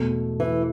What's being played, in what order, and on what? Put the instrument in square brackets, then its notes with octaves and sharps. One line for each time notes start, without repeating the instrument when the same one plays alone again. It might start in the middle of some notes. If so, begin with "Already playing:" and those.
Already playing: [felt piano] E2 B2 A3
[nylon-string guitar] E3